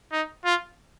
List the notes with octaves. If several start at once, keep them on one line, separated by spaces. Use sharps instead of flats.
D#4
F4